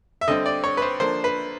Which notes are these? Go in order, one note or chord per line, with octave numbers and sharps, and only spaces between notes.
E5
D3 G3 C4 D#5
D5
C#5
B4
C5
D3 F3 A#3 D4 C5
B4